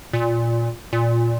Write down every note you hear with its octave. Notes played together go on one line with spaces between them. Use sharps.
A#2
A#2